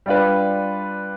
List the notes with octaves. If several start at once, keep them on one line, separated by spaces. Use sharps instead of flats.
G3 D4 F4 B4